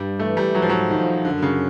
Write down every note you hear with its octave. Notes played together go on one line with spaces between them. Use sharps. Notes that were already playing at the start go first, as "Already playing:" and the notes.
Already playing: G2 G3
E3 A3
G3
G#2 F#3
F3
F#3
D#3 F3
F#2 D3
C#3